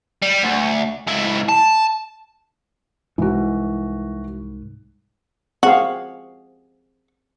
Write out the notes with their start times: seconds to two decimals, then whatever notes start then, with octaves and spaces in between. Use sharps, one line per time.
0.22 G3
0.43 D2
1.08 C#2 E4
1.49 A5
3.18 C2 G#2 E3 F#4
5.63 C4 F#4 G#4 F5